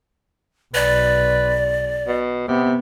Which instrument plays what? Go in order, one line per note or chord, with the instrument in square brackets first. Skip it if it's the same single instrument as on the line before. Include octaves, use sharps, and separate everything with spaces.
[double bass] B1 [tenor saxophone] B4 [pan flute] D5
[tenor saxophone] B2
[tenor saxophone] C3 [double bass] B3